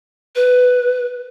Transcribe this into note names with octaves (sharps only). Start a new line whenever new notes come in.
B4